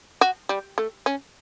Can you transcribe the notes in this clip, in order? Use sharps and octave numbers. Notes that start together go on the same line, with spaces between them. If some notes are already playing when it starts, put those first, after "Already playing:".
F#4
G3
A3
C#4